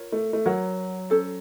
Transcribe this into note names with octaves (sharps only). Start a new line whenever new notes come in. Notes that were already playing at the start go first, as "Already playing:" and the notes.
Already playing: F4 A#4 C#5
A3
A3
F#3 F#4 A#4 C#5 F#5
C#4 A4 C5